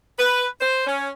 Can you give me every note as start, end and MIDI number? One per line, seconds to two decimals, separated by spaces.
0.18 0.45 71
0.60 0.83 72
0.87 1.09 61